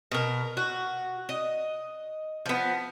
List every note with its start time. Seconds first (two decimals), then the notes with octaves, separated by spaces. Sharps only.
0.12 B2 A#4
0.57 F#4
1.29 D#5
2.46 F3 B3